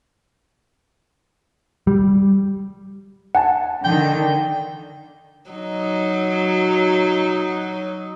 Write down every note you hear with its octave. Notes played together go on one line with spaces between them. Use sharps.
G3
F#5 G#5 A5
D3 D#3 G5
F#3 D#4